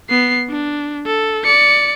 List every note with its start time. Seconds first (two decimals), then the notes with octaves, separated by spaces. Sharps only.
0.10 B3 C7
0.49 D4
1.06 A4
1.44 D5 C#7